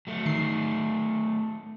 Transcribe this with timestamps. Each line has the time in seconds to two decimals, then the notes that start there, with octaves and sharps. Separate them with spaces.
0.07 F#3 A3
0.26 D#3 C7